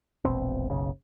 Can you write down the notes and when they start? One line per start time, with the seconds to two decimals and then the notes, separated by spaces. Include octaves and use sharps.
0.25 E1 A#1 B2 C4
0.70 F#1 B1 C#3